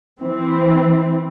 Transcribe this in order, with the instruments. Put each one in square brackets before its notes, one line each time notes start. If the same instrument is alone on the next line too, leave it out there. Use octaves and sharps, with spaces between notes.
[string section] E3 C4